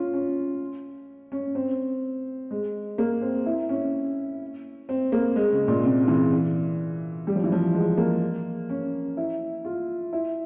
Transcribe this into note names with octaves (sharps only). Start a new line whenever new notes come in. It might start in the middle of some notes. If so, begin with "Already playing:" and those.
Already playing: C#4 F4
C#4
C#4
C4
G#3
A#3
C4
E4
C#4
C4
A#3
G#3
C#3
A#2
C3
E3
G3
F3
E3
F3
G#3
A#3
C#4
E4
F4
E4